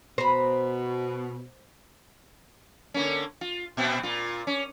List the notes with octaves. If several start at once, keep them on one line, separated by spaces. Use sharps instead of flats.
B2 C5 A#5 B5
D3 A#3 C#4
F4
A#2 B3 C4
A#2 F4
C#4